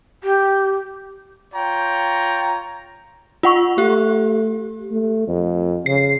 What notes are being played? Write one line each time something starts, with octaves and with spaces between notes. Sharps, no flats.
G4
F4 C#5 G5 A#5
F4 F#5 C#6
A3 G4
A3
F2
C#3 C7